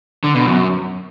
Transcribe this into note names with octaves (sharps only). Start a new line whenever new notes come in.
D3
B2
F#2